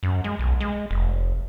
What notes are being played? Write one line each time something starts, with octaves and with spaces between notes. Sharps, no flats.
F#2
G#3
B1
G#3
F1